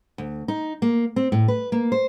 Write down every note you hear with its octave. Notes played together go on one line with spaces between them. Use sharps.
D2
D#4
A#3
C4
A2
B4
A#3
C5